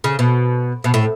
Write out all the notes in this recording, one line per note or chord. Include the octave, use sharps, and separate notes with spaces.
C#3
B2
B2
A2